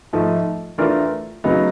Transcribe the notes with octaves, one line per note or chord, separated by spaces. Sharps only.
G#2 F3 A3
E3 A3 D4 F4 A#4
C#3 F#3 B3 D#4